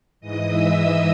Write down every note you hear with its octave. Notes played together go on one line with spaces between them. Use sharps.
G#2 E3 D#5 D#6
E5 E6
E5 E6